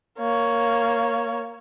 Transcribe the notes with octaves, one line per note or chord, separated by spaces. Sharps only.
A#3 C#5